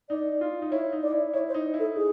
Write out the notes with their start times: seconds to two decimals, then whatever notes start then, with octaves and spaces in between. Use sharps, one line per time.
0.09 D#4 D5
0.41 F4
0.62 D#4
0.71 E4 C#5
0.93 D#4
1.03 D5
1.12 E4
1.33 E4 C#5
1.49 C5
1.54 D#4
1.74 E4
1.79 A4
1.95 D#4 G#4